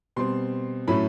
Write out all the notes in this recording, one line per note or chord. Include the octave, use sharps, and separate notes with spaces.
B2 G3 C4 C6
A2 F#3 A3 C#4 B5